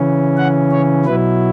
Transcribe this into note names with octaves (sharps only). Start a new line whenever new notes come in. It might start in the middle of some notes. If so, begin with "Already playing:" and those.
Already playing: C#3 E3 C#4
F#5
C#5
B2 F#3 E4 B4